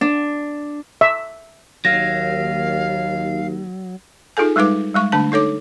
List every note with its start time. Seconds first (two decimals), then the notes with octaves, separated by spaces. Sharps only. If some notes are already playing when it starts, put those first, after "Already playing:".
0.01 D4
1.01 E5
1.85 D#2 F#3 F5 A#6
4.37 D#4 F4 G#4 A4 G#5
4.56 G3 G#3 D#4 B4 D6
4.94 G3 G#3 C#6
5.12 D3 A3 D4 A5
5.32 D#4 A4 C#5 D6